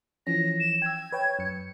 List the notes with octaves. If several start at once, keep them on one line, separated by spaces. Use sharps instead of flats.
E3 F3 C#4 A#6
E7
G5 E6 G#6
B4 C#5 G5
F#2 C#7